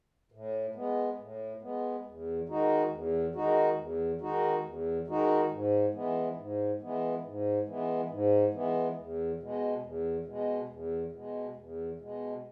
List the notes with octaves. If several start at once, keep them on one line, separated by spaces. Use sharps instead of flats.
A2
G#3 B3
A2
G#3 B3
E2
D#3 G#3 D#4 F#4
E2
D#3 G#3 D#4 F#4
E2
D#3 G#3 D#4 F#4
E2
D#3 G#3 D#4 F#4
G#2
E3 G#3 B3
G#2
E3 G#3 B3
G#2
E3 G#3 B3
G#2
E3 G#3 B3
E2
B2 G#3
E2
B2 G#3
E2
B2 G#3
E2
B2 G#3